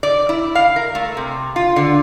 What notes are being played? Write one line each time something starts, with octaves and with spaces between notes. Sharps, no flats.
D5
E4
F5
A#4
A3
C3
F4
D3